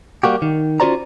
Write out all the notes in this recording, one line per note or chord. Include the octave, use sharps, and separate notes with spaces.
G3 A#3 F#4 G4
D#3
C#4 F4 F#4 C5 D5 A#5